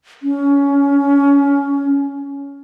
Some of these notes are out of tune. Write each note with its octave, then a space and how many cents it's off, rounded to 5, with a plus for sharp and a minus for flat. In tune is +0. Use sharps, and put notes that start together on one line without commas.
C#4 +20